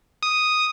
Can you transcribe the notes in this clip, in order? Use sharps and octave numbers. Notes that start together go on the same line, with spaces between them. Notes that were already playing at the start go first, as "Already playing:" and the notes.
D#6